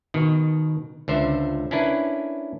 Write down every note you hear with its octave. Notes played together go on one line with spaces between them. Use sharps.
B2 D#3
C#2 D3 C5 E5
C#4 D4 E4 A#4 B4